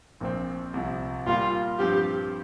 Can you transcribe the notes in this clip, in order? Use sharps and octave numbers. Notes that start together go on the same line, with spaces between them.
A#1 A#2 F3 C4
C2 C3 F3
A#2 G3 A#3 F4
G2 F3 C4 F4 G4